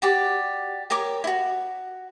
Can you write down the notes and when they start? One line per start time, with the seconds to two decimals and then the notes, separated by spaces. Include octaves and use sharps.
0.02 F#4 G4 D5
0.90 G4 A#4 C#5 D6
1.24 E4 F#4